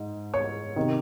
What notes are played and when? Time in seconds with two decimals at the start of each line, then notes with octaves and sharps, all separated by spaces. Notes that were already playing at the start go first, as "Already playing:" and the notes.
Already playing: G#2
0.34 C#5
0.76 C3 D#3